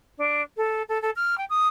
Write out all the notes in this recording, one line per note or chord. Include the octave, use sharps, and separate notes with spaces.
D4
A4
A4
A4
F6
G5
D#6